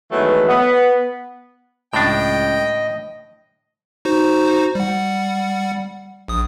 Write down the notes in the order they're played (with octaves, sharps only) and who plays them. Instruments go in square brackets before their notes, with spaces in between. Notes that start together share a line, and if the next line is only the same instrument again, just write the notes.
[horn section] D#3 E3 F#3 G#3 A3 B3
B3
[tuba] C#2 [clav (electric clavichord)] A2 D4 [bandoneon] D#5 [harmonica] G5
[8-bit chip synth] D#4 F#4 C5
G3 F#5
A#1 D#6